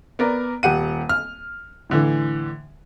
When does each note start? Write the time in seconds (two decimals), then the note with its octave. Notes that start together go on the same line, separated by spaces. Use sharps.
0.19 B3 A#4 D5
0.63 D#1 G4 F#5 D#7
1.09 F6
1.90 A2 D3 E3